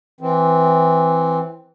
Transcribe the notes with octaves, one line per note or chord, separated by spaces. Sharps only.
E3 C4